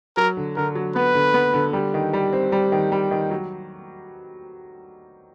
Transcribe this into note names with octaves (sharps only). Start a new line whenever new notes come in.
F#3 A#4
D3
D3 A#4
F#3
B3 B4
D3
B3
D3
G3
D#3
G3
C4
G3
D#3
G3
D#3
F#3